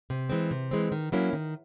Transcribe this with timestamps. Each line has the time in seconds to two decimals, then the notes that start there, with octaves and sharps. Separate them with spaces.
0.10 C3
0.30 E3 G#3 C4
0.51 C3
0.71 E3 G#3 C4
0.92 D#3
1.12 F#3 A#3 C#4 E4
1.33 D#3